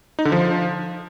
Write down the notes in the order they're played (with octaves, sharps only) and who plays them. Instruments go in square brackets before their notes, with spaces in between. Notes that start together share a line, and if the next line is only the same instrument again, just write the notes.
[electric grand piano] D#4
D3
F3